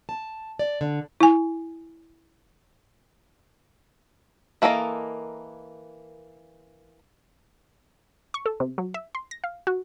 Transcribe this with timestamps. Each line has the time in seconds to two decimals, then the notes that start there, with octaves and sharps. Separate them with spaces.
0.09 A5
0.59 D5
0.81 D3
1.21 E4 G#5
4.62 E3 A#3 A4 A#4 D#5
8.34 C#6
8.46 A4
8.60 C3
8.78 F#3
8.94 E5
9.15 C6
9.31 A#6
9.44 F5
9.67 F#4